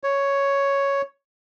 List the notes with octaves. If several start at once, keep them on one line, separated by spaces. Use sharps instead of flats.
C#5